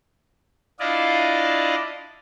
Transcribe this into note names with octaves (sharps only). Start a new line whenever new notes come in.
D4 E4 F4 D5 D#5 F5